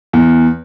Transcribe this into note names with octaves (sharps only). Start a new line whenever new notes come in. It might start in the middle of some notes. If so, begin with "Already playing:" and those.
E2